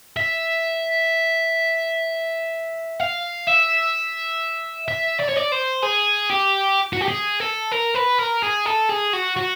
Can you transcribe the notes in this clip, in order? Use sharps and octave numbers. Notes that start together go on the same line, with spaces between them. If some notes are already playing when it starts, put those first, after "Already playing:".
E5
F5
E5
E5
D5
C#5
D5
C5
G#4
G4
F#4
G4
G#4
A4
A#4
B4
A#4
G#4
A4
G#4
F#4
F#4